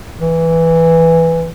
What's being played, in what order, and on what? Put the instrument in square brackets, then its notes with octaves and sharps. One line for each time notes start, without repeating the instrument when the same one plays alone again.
[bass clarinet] E3